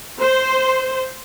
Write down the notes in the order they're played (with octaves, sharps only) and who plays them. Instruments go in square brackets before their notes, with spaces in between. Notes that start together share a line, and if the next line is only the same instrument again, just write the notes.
[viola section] C5